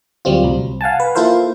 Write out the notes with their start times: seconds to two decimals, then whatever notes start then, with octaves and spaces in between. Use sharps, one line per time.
0.25 D2 F#3 G3 C4 F4
0.44 C2
0.81 F5 F#5 G#5 A5
1.00 B4
1.15 A#3 E4 F4 A4 C5 F5